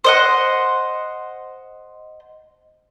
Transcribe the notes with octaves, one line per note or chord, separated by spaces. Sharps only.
C5 D#5 F#5